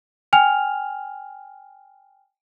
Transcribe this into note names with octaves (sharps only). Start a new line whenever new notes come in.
G5 G#5 F6 F7